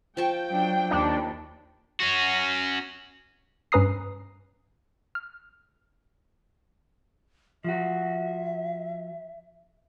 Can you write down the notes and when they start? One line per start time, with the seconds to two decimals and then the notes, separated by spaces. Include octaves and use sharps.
0.17 F3 G5 A5 C#6
0.50 F#3 D4
0.91 D#2 D4
2.00 C#4 F#4
3.72 G2 C#4 B4 A#5 D#6 C7
5.15 F6
7.64 F3 F#4 E5